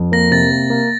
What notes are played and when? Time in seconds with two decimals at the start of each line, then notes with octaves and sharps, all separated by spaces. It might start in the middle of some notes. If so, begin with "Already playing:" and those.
Already playing: F2
0.12 A#3 A#6
0.31 C3 A6
0.52 A#3
0.70 A#3